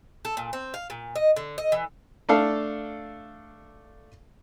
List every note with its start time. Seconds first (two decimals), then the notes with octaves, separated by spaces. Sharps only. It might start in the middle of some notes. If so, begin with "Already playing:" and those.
0.25 A4
0.37 A#2
0.53 C4
0.74 F5
0.90 A#2
1.16 D#5
1.36 D3
1.58 D#5
1.72 E3
2.29 A3 D4 A4 F5